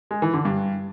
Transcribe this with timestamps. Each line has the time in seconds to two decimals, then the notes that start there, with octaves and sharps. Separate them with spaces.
0.11 G#3
0.22 E3
0.34 D3
0.45 G2